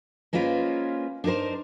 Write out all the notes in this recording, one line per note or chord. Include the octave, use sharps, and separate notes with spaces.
G#3 A#3 C#4 F4 B4 C5
D4 D#4 G#4 A#4 C5